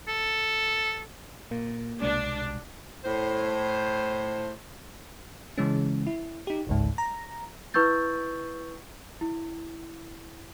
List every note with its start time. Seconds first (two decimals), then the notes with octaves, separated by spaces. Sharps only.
0.08 A4
1.51 A#2 A#3
2.02 C2 B2 G#3 D4
3.04 A2 C5
5.58 C#3 E3 G#3 C#4
6.07 E4
6.47 D#4 G4
6.67 G1 C#2 G#2
6.98 A#5
7.74 E4 B4 C#6 E6 G6 A6
9.21 E4